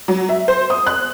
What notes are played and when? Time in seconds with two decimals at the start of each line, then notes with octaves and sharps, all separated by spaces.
0.08 F#3
0.29 E5
0.48 C5
0.70 D#6
0.87 F#6